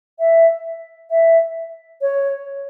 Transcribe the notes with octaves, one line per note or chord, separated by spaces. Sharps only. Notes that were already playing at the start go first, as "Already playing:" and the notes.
E5
E5
C#5